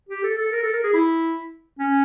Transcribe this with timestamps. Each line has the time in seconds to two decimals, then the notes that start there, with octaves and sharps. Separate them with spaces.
0.09 G4
0.23 A4
0.37 A4
0.52 A#4
0.63 A4
0.73 A#4
0.83 G#4
0.93 E4
1.79 C#4